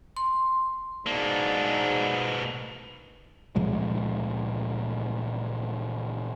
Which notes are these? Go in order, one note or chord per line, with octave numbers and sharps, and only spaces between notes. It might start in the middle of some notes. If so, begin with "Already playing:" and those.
C6
G#2 B2 A#3 D4
C#2 A#2 F3 G#3